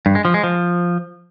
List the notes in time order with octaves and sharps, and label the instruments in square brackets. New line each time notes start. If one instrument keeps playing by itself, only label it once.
[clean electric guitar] G2
G#3
F3
G#3
F3